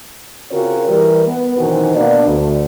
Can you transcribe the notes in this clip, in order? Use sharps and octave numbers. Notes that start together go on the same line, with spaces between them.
C#3 C4 F4 F#4 A#4 C#5
E3 G3 A#4
B3
F#2 B2 D#3 E3 C4 F#4
B2 A#3 B3 D4
D2